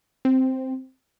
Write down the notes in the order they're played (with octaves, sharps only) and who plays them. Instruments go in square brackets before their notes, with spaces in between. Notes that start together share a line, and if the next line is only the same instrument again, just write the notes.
[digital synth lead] C4